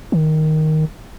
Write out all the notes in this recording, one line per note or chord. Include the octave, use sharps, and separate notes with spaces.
D#3